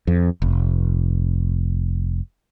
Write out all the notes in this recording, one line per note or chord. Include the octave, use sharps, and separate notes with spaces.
F2
F1